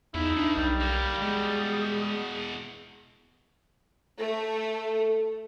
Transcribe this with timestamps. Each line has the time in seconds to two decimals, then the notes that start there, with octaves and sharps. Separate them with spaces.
0.14 E2 F3 D#4 E4 E5
0.37 G2 D4
0.57 B1 G3
0.81 A#3 G4
1.22 E2 B2 G#3 G#4
4.19 A3 A4